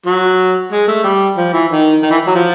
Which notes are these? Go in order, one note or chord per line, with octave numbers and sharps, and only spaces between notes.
F#3
G#3
A3
G3
F3
E3
D#3
D#3
E3
F#3
F3